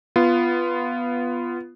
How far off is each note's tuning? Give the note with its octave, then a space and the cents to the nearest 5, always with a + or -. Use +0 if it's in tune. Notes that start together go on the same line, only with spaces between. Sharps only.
B3 +0 F4 -15